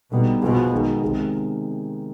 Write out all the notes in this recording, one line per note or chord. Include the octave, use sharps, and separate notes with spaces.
B2 D3 G3 B3 D#4
B2 F3 B3 F4 G#4
D#3 G#3 B3
C3 D#3 G#3